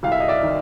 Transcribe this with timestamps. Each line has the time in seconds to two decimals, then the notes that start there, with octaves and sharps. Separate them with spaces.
0.03 C2 F5
0.12 E5
0.20 D#5
0.28 D5 E5
0.43 D#3